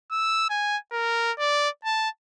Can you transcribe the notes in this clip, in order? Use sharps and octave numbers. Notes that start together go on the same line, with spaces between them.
E6
G#5
A#4
D5
A5